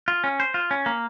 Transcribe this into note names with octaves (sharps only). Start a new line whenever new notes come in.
F4
C#4
C5
F4
C#4
A#3